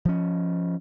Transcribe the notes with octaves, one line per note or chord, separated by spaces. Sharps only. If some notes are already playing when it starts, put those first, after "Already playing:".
F3 C#4